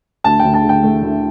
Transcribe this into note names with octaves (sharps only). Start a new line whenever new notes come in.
D2 A5
D2 G5
A5
D3
G5
A3
D2